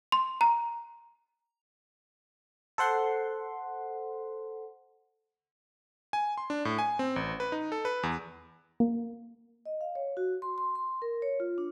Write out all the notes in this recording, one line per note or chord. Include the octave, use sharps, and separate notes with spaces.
C6
A#5
A4 C5 F#5 C6
G#5
C6
D4
A2
G#5
C4
A1
B4
D#4
A4
B4
E2
A#3
D#5
F5
C#5
F#4
C6
C6
C6
A#4
C#5
F4
D4